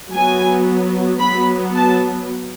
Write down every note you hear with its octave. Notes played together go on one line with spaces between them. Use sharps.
F#3 B3 G#5
F#3 B3 B5
A5